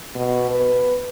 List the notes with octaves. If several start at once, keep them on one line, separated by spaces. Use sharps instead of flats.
B2
B4